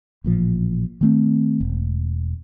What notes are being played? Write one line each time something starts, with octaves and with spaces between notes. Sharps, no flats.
A1 A#2 F3
D#3 A3 C4
E1